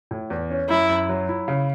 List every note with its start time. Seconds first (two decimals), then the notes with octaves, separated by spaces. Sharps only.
0.11 A2
0.30 E2
0.50 C#4
0.69 F#2 E4
0.90 F#2
1.09 F#3
1.29 E4
1.48 C#3